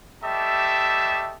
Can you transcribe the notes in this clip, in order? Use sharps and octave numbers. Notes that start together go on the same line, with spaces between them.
G3 A3 G4 D#5 E5 A5